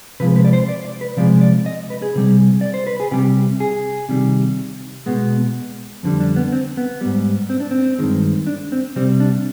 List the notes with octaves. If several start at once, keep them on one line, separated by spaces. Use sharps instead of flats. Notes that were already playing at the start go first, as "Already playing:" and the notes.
C3 F3 G#3 B4
B4
D5
C5
D5
D5
B4
C3 F3 G#3 D5
D5
D#5
B4
G#4
C3 G3
D5
C5
B4
G#4
C3 G3 G4
G#4
C3 D#3 G3
B2 G#3 B3
F2 D3 G3
D4
B3
C4
B3
G#2 G3
C4
D4
C4
G2 D#3 G#3
D4
C4
C3 G3 C4
D4